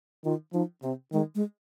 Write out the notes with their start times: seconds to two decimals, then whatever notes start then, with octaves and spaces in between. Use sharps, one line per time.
0.25 D#3 F4
0.53 F3 D#4
0.83 C3 C4
1.12 D#3 G#3
1.35 G#3